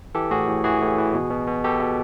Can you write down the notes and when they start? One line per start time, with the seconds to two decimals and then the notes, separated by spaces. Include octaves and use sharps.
0.15 E3 G4 A4
0.31 A2 F#4 G#4
0.48 A2
0.64 E3 F#4 G#4
0.81 A2
0.98 E3
1.14 B2
1.30 B2
1.48 B2
1.64 B2 G4 A4
1.80 B2